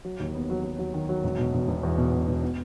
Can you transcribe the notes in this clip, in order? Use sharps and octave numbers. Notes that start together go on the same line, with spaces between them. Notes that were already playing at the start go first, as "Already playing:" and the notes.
F#3
D#2
B3
F#3
F#3
F#3
D#3
F#3
E1
B2
E1
E1
E2
B2
B2
B2
B3